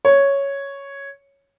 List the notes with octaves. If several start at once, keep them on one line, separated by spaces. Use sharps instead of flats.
C#5